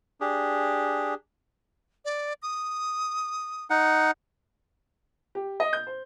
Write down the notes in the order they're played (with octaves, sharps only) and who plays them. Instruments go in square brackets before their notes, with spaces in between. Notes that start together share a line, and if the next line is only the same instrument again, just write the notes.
[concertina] D4 G4 G#4
[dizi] D5
D#6
[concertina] D#4 F#5
[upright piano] G4
D#5
G6
C5